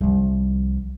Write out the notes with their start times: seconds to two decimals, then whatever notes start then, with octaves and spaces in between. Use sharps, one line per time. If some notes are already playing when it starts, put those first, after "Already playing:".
0.01 C2 F3